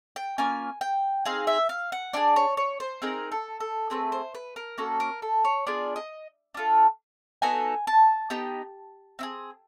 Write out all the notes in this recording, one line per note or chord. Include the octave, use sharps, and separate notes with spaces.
G5
A#3 C#4 F4 G#5
G5
C4 D#4 G#4 F5
E5
F5
F#5
D4 F4 G#4 D5
C#5
C#5
C5
C4 D#4 G#4 A#4
A4
A4
A3 C4 G#4 B4
C5
B4
A#4
A#3 C#4 F#4 A4
A#4
A4
C#5
B3 D4 F4 G#4 D5
D#5
D4 F4 A4
B3 D#4 F#4 A4 G#5
A5
B3 D#4 G4
C4 E4 G#4